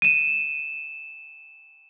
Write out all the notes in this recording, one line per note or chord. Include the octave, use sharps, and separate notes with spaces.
D#7 E7